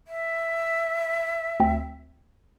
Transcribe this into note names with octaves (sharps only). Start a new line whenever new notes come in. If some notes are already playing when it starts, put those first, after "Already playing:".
E5
D2 C4